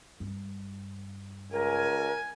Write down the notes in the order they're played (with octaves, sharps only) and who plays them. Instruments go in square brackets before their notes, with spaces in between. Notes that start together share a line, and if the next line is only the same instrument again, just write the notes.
[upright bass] G2
[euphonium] C#2 [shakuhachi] A#4 [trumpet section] G#5